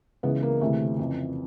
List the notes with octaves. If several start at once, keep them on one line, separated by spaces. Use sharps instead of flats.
C#2 C#3 E3 B3
A#3
D2 C3 E3 A3
F2 C#3 E3